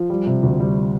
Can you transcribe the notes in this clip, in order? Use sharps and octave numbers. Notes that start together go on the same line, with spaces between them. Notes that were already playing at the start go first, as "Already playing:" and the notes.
Already playing: F3
G3
C3
D2
G3